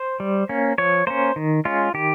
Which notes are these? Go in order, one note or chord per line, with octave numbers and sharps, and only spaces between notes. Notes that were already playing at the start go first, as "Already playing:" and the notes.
Already playing: C5
G3
A#3 C#4
F3 C#5
A#3 C#4 C5
D#3
G#3 C#4 F4
D#3 G4